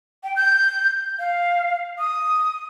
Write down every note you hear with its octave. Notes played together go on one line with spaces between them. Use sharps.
G5
G6
F5
D#6